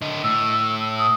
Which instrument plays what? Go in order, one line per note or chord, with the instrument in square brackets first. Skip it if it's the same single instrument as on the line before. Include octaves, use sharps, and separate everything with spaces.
[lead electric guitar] D3 D#5
[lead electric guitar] A2 [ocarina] E6
[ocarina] D#6